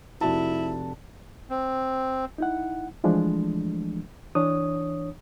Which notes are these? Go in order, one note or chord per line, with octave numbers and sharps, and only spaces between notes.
F1 E4 F#4 A5
C4
D#4 E4 F#5
E3 F3 G#3 A3 D4
E3 D4 C#5 D#6